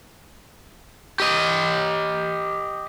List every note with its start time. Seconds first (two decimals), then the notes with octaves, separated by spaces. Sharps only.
1.20 G4 D#5